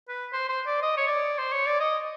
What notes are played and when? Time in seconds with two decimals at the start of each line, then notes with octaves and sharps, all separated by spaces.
0.09 B4
0.33 C5
0.49 C5
0.66 D5
0.82 D#5
0.97 C#5
1.07 D5
1.38 C5
1.52 C#5
1.66 D5
1.80 D#5